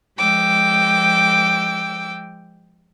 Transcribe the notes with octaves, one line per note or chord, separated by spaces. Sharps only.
F3 G#3 G5 D6 E6